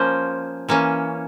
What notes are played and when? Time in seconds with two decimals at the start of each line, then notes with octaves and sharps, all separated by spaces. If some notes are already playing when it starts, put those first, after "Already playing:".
Already playing: F3 A#3 C#4 C5
0.69 E3 A#3 C#4